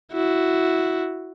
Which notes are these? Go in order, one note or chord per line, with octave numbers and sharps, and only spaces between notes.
E4 F#4